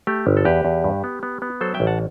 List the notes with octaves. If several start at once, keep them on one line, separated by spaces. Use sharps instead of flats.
A3 G4
G1
A4
E2 G4 B4
E2
G2
B3
B3
B3
F#3 A4 C5
E5 G5
A1
F#5 A5